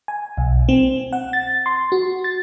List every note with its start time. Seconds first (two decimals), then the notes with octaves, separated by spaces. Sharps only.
0.08 G#5
0.37 B1
0.69 C4
1.13 F#5
1.33 A6
1.66 C6
1.92 F#4
2.24 A6